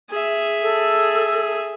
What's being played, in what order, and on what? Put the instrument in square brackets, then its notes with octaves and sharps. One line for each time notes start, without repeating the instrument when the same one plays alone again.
[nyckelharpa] G#4 E5
[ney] A4